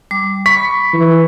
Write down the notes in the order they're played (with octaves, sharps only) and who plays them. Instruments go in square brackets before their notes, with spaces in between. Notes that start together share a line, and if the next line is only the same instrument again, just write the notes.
[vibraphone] G3 D6
[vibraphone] B5 [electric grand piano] C#6 B6
[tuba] E3